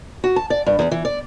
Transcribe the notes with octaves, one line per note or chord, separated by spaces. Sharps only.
F#4
A5
D5
G2
E2
E3
D5